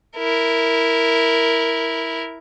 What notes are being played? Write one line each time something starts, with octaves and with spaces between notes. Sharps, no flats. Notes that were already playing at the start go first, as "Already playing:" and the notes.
E4 A#4